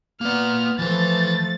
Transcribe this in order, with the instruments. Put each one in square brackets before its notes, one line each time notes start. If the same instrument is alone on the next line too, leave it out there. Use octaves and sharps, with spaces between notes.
[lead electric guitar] A#3 D5 [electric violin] B3 F6
[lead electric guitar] E3 B4 [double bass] F3 A3 [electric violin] A6